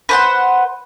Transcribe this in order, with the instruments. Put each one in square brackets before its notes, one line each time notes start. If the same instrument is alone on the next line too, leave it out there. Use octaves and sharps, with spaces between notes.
[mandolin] B4 C5 F#5